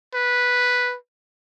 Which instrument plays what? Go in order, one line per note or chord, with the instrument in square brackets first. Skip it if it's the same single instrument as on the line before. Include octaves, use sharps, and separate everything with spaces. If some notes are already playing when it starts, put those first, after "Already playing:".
[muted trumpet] B4